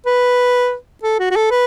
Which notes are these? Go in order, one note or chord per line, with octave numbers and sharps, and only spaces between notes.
B4
A4
F#4
F#4
A4
B4